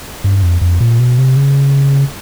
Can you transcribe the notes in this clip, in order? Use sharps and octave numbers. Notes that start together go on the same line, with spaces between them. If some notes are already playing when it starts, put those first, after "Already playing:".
G2
F2
F2
A#2
B2
C3
C#3